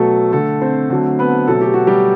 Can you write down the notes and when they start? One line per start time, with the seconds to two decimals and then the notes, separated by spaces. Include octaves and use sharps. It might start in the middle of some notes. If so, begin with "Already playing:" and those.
Already playing: B2 F#3 A3 A4
0.32 D3 A3 A4
0.61 C4 C5
0.90 D3 F#3 A3
1.19 B3 B4
1.47 B2 F#3 A3 A4
1.61 G4
1.73 F#4
1.87 G3 G4